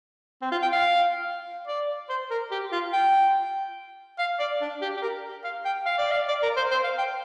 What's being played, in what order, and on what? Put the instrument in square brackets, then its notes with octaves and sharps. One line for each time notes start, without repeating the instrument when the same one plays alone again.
[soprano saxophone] C4
F4
G5
F5
D5
C5
A#4
G4
F4
G5
F5
D5
D4
G4
G4
A#4
F5
G5
F5
D5
F5
D5
A#4
C5
C5
F5
G5